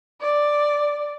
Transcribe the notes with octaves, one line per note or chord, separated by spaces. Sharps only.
D5